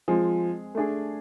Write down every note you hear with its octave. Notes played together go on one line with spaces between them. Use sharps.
F3 G#3 C4 G#4
A3 D4 G#4